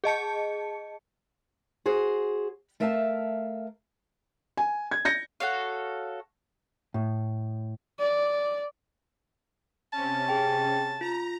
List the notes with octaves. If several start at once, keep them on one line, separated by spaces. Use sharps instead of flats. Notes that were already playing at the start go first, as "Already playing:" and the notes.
G#4 D#5 A5 C#7
F#4 G#4 C5
A3 A#4 E5 F5 G5 A5
G#5
G#6
G6 A#6 C#7
F#4 A4 C#5 F5
A2
D5
C3 C#4 A5
G#4 G5
F4 A#5